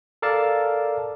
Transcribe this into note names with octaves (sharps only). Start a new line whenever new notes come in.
A4 A#4 D5 F5 A5